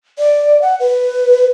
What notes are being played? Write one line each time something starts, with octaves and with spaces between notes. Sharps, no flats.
D5
F#5
B4